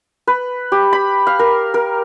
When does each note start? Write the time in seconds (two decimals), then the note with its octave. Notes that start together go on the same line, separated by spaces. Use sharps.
0.27 B4
0.72 G4
0.93 B5
1.27 F5
1.39 A#4
1.74 A#4